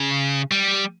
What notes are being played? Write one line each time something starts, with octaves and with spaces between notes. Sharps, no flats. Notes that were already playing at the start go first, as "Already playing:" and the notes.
Already playing: C#3
G3